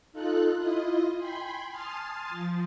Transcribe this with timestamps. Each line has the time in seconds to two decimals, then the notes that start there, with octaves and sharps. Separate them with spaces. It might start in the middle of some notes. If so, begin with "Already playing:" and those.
0.12 D#4 F4 A4 F#6
0.57 E4 F4 D#5
1.17 G5 G#5 B5 C6
1.71 G#5 A5 C6 D#6 F6 A6
2.29 F3